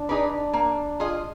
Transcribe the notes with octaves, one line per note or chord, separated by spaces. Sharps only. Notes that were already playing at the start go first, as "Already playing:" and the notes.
Already playing: D4
D#4 G#4 B4 D5
A#3
F4 G#4 D#5